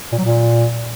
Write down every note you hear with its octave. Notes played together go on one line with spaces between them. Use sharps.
A#2
F#3
A#2